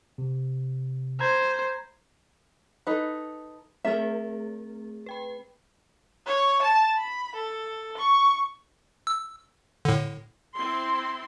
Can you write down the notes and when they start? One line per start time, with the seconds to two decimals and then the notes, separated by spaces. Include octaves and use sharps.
0.18 C3
1.20 C5 A#5 B5 G#6
2.87 D#4 A4 B4
3.85 A3 C4 G#4 A#4 E5
5.06 B4 G5 B5
6.26 C#5
6.63 A5
6.97 B5
7.36 A4
7.98 C#6
9.07 E6
9.85 A2 D3
10.55 C4 E4 C6